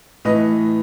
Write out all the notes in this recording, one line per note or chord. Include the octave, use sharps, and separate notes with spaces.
A2 E3 B4 D#5